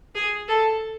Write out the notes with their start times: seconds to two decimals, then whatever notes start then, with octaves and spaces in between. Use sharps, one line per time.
0.15 G#4
0.48 A4